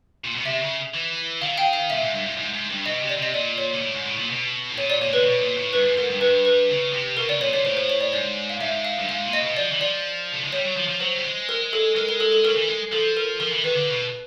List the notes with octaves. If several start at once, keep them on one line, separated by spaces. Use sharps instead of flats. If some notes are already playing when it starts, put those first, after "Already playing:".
A#2
B2
C3 E5
C#3
E3
D#3 F5
F5 G5
F5
A#2 E5
G#2
G2
G#2
G#2
G#2
G2
B2 D#5
C3
D5
C3 D#5
A#2 D5
C#5
A#2
A2
G#2
A2
A#2
B2
A2
A#2 C#5
D5
A#2 C#5
A2
A#2 B4
B2
A#2
A2
G2 B4
G#2
G#2 A#4
G2
G2 B4
B4
C#3
C3
B2 A#4
C#3 D5
A#2 C#5
A#2 C#5
A2 C5
C5
C#5
D5
G#2 D5
F5
G#2 E5
F5
G2
G#2 F5
A#2
D#5
B2
F3 D5
E3
F3 D5
A3
G#3
G3 C#5
F#3
F3
F3
F#3 C5
G3
G#3
A#4
A4
G#3 A#4
A#4
A4
A4
F#3 A#4
E3
G#3
F3 A4
A#4
F3 A#4
E3
D#3 B4
D3
B2